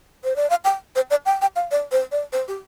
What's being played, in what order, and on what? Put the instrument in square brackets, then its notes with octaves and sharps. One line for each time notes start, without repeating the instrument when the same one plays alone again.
[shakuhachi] C5
D5
F5
G5
C5
D5
G5
G5
F5
D5
C5
D5
C5
G4